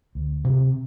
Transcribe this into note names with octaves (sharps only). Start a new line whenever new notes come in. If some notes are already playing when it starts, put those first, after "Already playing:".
D2
C3